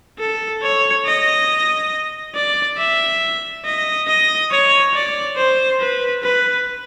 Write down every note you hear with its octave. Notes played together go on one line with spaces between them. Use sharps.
A4
C#5
D#5
D5
E5
D#5
D#5
C#5
D5
C5
B4
B4